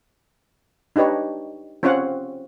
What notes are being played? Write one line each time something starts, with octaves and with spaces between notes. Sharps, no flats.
D4 D#4 G4 B4 C#5
C4 C#4 F4 C#5 F5 F#5